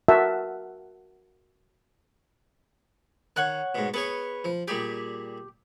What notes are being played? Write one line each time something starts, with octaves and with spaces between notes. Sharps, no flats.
F#4 A#4 E5 F#5 A5 E6
D#3 C#5 F#5 F#6
G#2 B2
B3 G#4 B4 C#5
F3
A#2 G3 G4 G#4